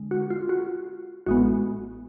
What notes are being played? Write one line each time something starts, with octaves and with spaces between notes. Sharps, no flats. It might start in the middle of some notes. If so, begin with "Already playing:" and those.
Already playing: D3 G#3
F#4
F4
F#4
A1 A2 G#3 B3 F#4